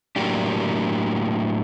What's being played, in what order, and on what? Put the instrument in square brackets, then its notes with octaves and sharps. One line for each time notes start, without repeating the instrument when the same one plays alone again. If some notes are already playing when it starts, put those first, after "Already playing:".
[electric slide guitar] A2 F#3 A#3 D4 G4